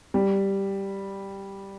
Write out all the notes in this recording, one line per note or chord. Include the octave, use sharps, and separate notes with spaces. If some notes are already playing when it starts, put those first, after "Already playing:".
G3